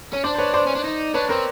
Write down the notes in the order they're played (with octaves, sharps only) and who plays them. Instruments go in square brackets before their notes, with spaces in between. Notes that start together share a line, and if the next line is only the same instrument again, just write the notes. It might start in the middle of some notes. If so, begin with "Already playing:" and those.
[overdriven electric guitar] C#4
[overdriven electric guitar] D4 [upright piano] C5 D5
[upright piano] C5
B4 C#5
C5 D5
[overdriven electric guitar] C#4
D4
D#4
[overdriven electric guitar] D4 [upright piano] B4 C#5
[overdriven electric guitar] C4 [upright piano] A#4 C5